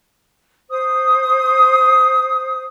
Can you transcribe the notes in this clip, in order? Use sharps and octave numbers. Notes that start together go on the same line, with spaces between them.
C5 D#6